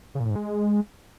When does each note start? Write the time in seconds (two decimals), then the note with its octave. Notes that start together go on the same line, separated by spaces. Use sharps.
0.15 C#3
0.20 A#2
0.25 A2
0.30 G#2
0.36 G#3